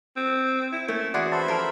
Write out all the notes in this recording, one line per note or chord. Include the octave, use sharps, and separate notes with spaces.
C4
E4
A3 A#3 C#4
E3 F#4 G#4 D5 F#5 C6
C5 E5 A5 B5 C6
F3 A4 A#4 G5 F6